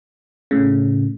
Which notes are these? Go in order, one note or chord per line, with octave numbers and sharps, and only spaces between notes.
A2 C#3